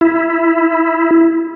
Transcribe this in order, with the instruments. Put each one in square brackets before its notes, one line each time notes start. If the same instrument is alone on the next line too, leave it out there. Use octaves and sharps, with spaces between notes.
[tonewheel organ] E4